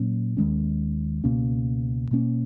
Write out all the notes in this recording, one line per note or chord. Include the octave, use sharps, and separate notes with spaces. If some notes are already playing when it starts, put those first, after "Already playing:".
Already playing: A#2 F#3 A#3 C#4
D#2 D#3 G#3 C#4
C#2 B2 A#3 C#4
B2 A#3 C#4